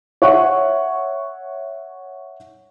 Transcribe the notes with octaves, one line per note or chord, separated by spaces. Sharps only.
C#5 E5 F#5 C#6